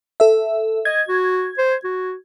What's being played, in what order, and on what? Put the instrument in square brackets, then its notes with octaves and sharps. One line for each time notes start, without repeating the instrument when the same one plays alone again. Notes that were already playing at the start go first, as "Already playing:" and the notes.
[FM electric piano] A4 E5
[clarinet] D#5 [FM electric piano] G#6
[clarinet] F#4
C5
F#4